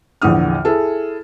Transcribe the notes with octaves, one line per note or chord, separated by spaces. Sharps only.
A#1 E2 D3 D#6 F6
E4 G#4 A4